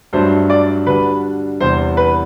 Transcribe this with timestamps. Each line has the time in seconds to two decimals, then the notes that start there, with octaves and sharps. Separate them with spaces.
0.13 G2 F#3 A3 D4 C5
0.50 D5
0.87 D3 G3 D4 F#4 B4
1.60 E2 C3 G3 C5
1.97 B4